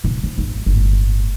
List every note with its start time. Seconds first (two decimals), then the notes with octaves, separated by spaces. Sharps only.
0.04 A#2 E3
0.23 F3
0.38 G#1 E2
0.66 G1 A2